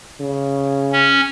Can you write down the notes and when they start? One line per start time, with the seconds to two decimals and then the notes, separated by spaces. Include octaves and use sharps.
0.20 C#3
0.93 C#4